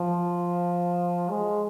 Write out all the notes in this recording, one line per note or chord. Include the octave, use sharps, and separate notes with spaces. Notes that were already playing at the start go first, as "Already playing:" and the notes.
Already playing: F3
G#3